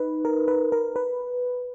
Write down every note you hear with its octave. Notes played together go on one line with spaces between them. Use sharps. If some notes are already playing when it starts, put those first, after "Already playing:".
Already playing: D#4 B4
A#4
B4
A#4
B4